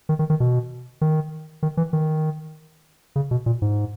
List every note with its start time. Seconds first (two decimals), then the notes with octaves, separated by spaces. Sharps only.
0.09 D#3
0.19 D#3
0.30 D#3
0.40 B2
1.01 D#3
1.63 D#3
1.77 E3
1.93 D#3
3.16 C#3
3.31 B2
3.46 A#2
3.62 G#2